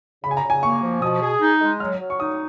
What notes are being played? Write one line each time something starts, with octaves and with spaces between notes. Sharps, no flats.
C#3 B5
G#5
A#5
C#3
G#5
A#3 C#6
F3
B2 D#6
G#4
D#4
G#3
F#3 F6
F#3
C#6
D#4 D#6